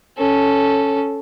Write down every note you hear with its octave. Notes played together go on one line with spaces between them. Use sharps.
C#4 A4